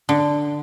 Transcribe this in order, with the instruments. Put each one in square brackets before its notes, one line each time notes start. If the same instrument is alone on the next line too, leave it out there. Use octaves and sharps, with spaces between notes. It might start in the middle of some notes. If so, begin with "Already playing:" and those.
[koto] D3